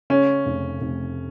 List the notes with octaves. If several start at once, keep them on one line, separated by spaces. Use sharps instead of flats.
C#3 C#4
F1
F1